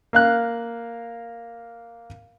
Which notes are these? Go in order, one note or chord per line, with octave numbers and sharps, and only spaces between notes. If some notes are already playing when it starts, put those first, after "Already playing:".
A#3 F5 F#6